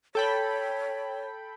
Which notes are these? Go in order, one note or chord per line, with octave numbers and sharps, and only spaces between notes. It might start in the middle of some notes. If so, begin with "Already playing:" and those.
A4 C#5 G5 B5